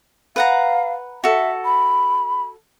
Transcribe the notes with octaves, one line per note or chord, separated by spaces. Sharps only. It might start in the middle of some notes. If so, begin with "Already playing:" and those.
B4 F5 F#5 A#5
F#4 A4 E5
B5